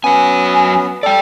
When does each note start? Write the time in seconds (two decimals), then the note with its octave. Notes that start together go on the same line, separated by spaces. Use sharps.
0.04 F#3 B3 C#4 G#5
1.03 A4 D5 G5